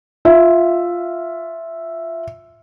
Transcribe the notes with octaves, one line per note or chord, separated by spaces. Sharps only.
F4 E5